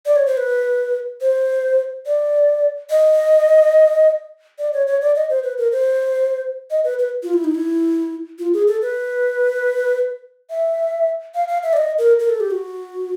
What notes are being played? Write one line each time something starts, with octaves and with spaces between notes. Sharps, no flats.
D5
C#5
C5
B4
C5
D5
D#5
D5
C#5
C#5
D5
D#5
C5
B4
A#4
C5
D#5
B4
B4
F4
E4
D#4
E4
F4
G#4
A4
B4
E5
F5
F5
E5
D5
D#5
A#4
A#4
A4
G4
F#4